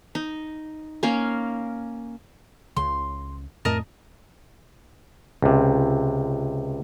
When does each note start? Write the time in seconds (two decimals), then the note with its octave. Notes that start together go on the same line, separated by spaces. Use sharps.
0.15 D#4
1.03 A#3 C#4 A#4 F5
2.77 C#2 C#3 C6
3.65 F2 A2 A3 A#4 D#5 A5
5.42 C#2 C3